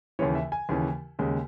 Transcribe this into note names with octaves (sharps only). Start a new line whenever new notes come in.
D#2 C#3 E3 C#5
E5
G#5
D#2 C#3 E3
D#2 C#3 G#3